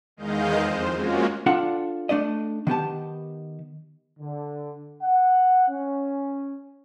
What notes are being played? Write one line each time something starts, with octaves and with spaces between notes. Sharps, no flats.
E2 D#3 G#3 D#5 F5 G6
F2 C5
G#3 A#3 C#4 F4 F#4
D4 F4 A4 F#5
A3 D4 D5 D#5
D#3 B3 G4 A5
D3
F#5
C#4